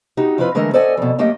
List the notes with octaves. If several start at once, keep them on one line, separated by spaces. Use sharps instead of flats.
D#4 F#4 G4
F2 F3 E4 F4 B4
D3 E3 G#3 A3 A#4
A4 C5 D5 D#5 F#5 G#5
F2 B2
F#2 A3 A#3 G4 D#5